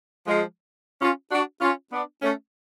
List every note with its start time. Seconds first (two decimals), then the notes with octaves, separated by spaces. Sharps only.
0.26 F3 G#3
1.01 C#4 F4
1.31 D4 F#4
1.61 C#4 F4
1.91 B3 D4
2.22 A3 C#4